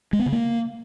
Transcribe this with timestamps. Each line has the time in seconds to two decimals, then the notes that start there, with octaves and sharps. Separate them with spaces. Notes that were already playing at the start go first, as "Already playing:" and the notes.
0.13 G#3
0.19 B3
0.26 C#3
0.32 A#3